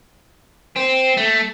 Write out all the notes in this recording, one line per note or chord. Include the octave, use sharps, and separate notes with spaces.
C4
A3